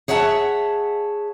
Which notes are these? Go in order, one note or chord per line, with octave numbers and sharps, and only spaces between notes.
G#4 C#5 E5 F#5 A5